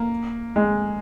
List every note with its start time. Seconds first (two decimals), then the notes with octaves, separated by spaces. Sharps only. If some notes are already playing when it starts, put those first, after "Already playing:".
Already playing: A#3
0.56 G#3